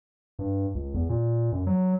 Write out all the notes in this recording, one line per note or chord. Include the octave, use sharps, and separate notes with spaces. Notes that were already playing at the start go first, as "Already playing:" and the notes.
G2
C#2
E2
A#2
F#2
F#3